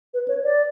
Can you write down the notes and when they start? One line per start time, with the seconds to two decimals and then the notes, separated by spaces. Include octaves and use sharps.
0.14 B4
0.28 C#5
0.44 D5